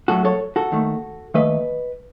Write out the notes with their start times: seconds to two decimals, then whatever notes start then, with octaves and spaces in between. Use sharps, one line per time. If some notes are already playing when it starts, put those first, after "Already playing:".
0.08 A2 F#3 A3 F#4 A4
0.25 A4 C#5
0.56 F#4 A4
0.72 D#2 D#3 A3
1.34 D#2 D#3 A3 B4 D#5